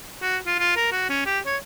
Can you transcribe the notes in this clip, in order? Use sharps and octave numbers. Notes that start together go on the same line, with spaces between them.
F#4
F4
F4
A#4
F#4
C#4
G4
C#5